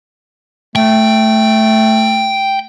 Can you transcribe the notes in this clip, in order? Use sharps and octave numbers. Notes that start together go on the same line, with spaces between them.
A3 G5